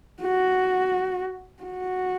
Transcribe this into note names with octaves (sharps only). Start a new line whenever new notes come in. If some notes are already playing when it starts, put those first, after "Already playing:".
F#4
F#4